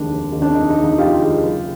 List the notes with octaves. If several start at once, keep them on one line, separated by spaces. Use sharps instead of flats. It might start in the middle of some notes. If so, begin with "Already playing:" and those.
Already playing: F1 D#2 D#3 G#3 D4
F1
D#2 D#3 G#3
D4
F1 D#4
D#4
D#2 D#3 G#3
D#4
F1 F4 G4
D#2 D#3 G#3
F#1